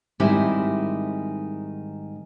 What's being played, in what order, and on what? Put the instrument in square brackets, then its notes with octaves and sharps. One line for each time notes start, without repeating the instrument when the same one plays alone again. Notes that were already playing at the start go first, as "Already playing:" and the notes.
[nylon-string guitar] G#2 D#3 G3 C4 E4